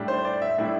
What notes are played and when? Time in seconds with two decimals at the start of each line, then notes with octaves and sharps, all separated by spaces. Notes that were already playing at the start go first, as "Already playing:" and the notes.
Already playing: A2 G3 D4
0.08 C5
0.25 D5
0.42 E5
0.58 A2 G3 D4 E4